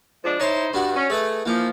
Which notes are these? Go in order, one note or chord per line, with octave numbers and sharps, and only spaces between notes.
F3 G#3 D4
D#4 E4 C5 C#5 A5 C6
G2 D4 F#4
C#4
A3 G#4 B4 D#5
E3 F3 A#3 D#4